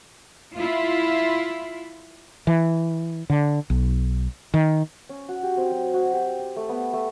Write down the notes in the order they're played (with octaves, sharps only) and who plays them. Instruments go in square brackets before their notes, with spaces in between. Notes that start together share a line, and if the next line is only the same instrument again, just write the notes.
[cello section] E4 F4
[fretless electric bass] E3
D3
B1
D#3
[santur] C#4
F#4
G4
C4
F#3
F#4
G4
G4
A3
B3
A3